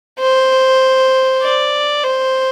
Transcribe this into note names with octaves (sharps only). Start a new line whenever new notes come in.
C5
D5
C5